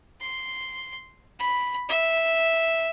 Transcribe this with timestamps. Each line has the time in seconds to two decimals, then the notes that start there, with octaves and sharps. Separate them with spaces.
0.21 C6
1.39 B5
1.89 E5